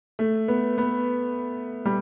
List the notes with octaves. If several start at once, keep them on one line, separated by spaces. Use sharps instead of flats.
A3
B3
B3
G3